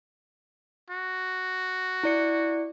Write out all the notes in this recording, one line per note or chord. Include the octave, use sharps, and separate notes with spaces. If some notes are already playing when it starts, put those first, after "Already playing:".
F#4
E4 D5 C#7